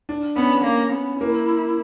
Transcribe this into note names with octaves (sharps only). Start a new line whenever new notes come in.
D4
B3 C#4
A#3
B3
A#3 E4